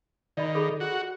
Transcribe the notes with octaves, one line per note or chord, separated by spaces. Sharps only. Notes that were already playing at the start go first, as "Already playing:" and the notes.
D#3 D5 D#5 B5
G#4 A4 B5
F#4